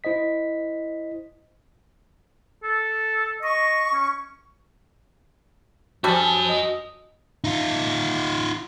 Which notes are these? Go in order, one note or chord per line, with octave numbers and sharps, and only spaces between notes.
E4 C5 D#5 B6
A4
D#5 C#6
C#4
F3 G3 D4 F#4 A4 G#5
D#5
D#4 F4